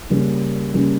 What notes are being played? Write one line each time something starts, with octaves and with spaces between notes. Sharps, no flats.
C#3 G3 A#3 C#4
C#3 G3 A#3 C#4